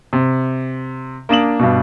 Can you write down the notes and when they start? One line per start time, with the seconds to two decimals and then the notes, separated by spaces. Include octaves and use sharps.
0.13 C3
1.29 A#3 D4 D#6 E7 F#7
1.59 G2 B2